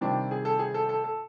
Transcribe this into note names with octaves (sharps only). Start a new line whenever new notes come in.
C3 D#3 G3 C4 D4
G#4
A4
G#4
A4
A4
A4